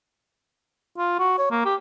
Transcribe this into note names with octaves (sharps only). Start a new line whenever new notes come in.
F4
F#4
C#5
A#3
G4